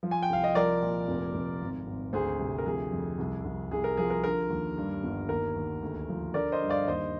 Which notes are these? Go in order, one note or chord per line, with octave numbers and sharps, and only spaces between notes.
F3
G#5
G5
C2 F5
D#5
F3 A#4 D5
A#2
F1
F1
G#1
G#1
D2 G#4 C5
C3
A#4
F3 G#4
F2
C2
C2
C2 G#4
A#4
F3 G#4
A#4
D3 A#4
D#2
G2
G1
D#2 A#4
D#2
D2
F3
D3 A#4 D5
C5 D#5
G2
D5 F5
D#2 C5 D#5